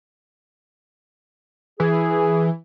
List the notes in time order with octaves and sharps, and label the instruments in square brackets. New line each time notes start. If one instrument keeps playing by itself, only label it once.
[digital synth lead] E3 [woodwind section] G#4